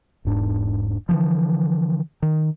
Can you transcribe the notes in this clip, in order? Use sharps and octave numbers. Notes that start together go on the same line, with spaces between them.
E1 G#2 D4
D3 E3 F3
D#3